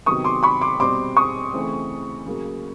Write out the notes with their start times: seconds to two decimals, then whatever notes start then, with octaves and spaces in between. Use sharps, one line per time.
0.06 C3 D#3 F#3 B3 C#6 D#6
0.24 C6 D6
0.43 B5 C#6
0.61 C6 D6
0.80 B2 G3 C4 C6 D6
1.17 C#6 D#6
1.53 C#3 E3 A3 C4
2.26 C#3 F#3 A#3